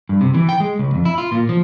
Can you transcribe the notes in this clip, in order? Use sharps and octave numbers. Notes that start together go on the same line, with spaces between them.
G2
C3
E3
G5
G#3
C#2
F2
E4
F4
A#2
F3